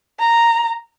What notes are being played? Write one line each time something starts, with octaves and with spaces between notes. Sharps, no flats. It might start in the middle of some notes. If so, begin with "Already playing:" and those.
A#5